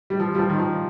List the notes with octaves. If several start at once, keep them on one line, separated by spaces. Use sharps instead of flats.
G3
F3
G3
F3
D#3
F3